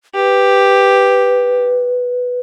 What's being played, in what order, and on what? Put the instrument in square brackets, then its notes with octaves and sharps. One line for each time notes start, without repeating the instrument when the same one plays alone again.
[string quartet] G4 [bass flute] B4